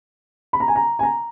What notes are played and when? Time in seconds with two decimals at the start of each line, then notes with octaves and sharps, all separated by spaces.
0.53 B5
0.60 A#5
0.68 G#5
0.76 A#5
0.99 G#5
1.03 A#5